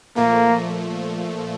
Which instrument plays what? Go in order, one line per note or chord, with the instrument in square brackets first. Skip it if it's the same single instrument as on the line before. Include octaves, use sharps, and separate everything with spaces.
[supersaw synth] A#2 F3 A3 [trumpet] A#3